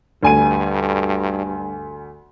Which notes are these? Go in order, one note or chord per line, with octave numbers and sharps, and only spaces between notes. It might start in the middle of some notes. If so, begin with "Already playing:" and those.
D2 G2 G#5 D#7